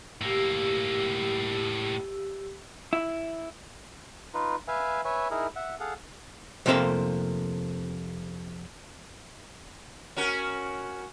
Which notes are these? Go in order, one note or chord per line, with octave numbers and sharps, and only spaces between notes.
A2 A#3 G4 E6
E4
D#4 F4 B4
B4 E5 F5 G#5
B4 C#5 E5 G#5
D#4 E4 G#4 A#4
E5 F#5
G#4 A4 F5 F#5
F2 C3 A#3 C5 E5 F5
C#4 F#4 A#4